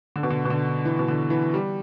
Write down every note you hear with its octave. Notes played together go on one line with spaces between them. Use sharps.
D3
B2
D3
B2
D3
E3
B2
D3
E3
G3